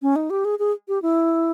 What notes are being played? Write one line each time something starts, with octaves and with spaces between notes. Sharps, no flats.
C#4
D#4
G4
G#4
G#4
G4
E4